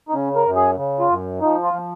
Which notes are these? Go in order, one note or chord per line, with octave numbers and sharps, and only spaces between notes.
D#4
C#3 C#4
A#4
F#2
G#4
C#3
F4
F#2
F3 D#4
F4
F3